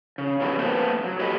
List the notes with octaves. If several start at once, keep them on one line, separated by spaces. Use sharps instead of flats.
C#3
C#3 F#3 G3 B3
A3 A#3 B4 C5
F#3
G4 A4 B4 D#5